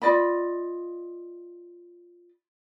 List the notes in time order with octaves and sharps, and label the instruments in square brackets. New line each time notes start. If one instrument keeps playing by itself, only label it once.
[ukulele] F4 D5 D#5 B5